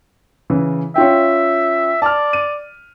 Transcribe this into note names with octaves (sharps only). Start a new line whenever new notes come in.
C#3 E3
C#4 F4 E5 G5
D5 A5 F6
D#7